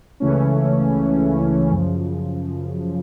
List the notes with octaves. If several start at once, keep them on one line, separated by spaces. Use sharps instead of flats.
C#2 C#3 E3 A3 C#4
F#2 C#3 F3